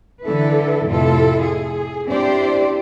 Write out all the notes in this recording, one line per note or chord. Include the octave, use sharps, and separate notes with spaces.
D3 E3 E4 A4 B4
F2 A2 C3 E4 F4 A4
G#4
C4 D4 E4 G4 C5 D5